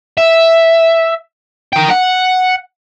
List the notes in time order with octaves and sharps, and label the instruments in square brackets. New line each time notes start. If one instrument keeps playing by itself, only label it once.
[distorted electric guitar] E5
A#4 G5
F#5